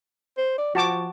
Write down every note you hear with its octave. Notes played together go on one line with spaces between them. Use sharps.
C5
D5
F3 F#4 A5 D6